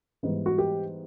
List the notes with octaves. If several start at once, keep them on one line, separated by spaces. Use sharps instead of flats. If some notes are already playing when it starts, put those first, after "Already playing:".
G#2 E3 G3 B3
F#4
G4